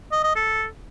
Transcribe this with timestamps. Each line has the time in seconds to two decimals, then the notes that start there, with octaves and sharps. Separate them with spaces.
0.12 D#5
0.24 D#5
0.36 A4